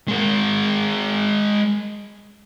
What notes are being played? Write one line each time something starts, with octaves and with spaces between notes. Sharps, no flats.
G#3 A#4